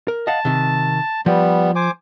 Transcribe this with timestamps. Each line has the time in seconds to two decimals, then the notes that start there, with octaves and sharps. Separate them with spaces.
0.08 A#4
0.27 D#5 F5 F#5 A5
0.45 C3 D#3
1.26 F3 G3 B3
1.76 C5 G#5 D6